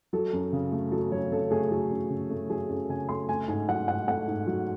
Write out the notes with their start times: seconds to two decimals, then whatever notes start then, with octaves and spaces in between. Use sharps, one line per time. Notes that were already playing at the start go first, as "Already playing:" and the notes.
0.13 F#3 A4
0.33 F#2
0.53 C#3
0.72 A3
0.92 F#3 A4
1.12 F#2 C#5
1.31 C#3 A4
1.51 A3 G#4
1.71 F#3 A4
1.91 F#2
2.10 C#3
2.30 A3
2.49 F#3 G#4
2.69 F#2 A4
2.89 C#3 G#5
3.09 A3 C6
3.29 A3 G#5
3.48 G#2 G#5
3.68 F#3 F#5
3.88 G#2 F#5
4.08 A3 F#5
4.28 G#2
4.47 F#3